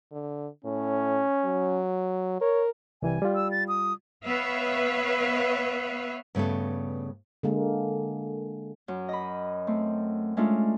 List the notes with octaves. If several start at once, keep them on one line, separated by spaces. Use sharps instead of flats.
D3
A2 C#4
F#3
A#4 C#5
C2 E3 G3 G#5
G3 F4
E6
A6
D#6
B3 B4 C#5 E5 F5
G2 C#3 A3 B3 A4
D3 G#3 A#3
F#2
D#5 B5
A3 C4
G#3 A3 C#4 D4 F4